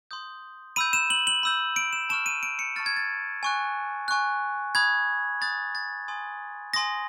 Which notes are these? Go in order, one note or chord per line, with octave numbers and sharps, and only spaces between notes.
C6 D#6 G6
B5 E6 G6 D#7
E7
F#7
F#7
B5 E6 G6
D7
E7
A5 C#6 F6 E7
D#7
D7
C#7
A5 C#6 F6 A6
G#6
A6
G#5 C#6 F#6
G#5 C#6 F#6
B5 D#6 F#6 G#6
B5 D#6 F#6 A6
A6
G#5 C6 D#6
G#5 C6 D#6 A#6